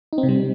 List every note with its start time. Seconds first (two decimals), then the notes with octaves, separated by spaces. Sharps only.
0.13 D#4
0.18 C4
0.23 C3
0.29 G3